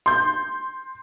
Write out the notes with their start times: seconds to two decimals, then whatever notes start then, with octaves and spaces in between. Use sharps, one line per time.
0.06 C6 G6